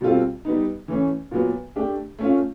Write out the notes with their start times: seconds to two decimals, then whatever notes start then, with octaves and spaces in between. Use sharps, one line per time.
0.01 B2 G3 C4 F4 A4
0.45 G3 B3 D#4
0.88 E3 A3 C#4
1.31 A#2 F#3 B3
1.76 A3 D4 G4
2.19 A3 C#4 F4